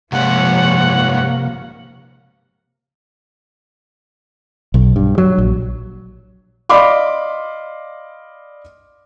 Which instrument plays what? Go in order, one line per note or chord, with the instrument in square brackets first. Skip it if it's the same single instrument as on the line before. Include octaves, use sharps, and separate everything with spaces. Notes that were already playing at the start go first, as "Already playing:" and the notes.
[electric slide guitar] G2 G3 G#3 [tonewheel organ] C3 A#3 [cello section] F3 C#5 [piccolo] F#5
[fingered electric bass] B1
G2
F#3
A#1
[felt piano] D5 D#5 F5 B5 C6 D6